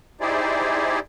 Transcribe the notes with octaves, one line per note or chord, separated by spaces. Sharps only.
D#4 E4 G4 G#4 C5 D5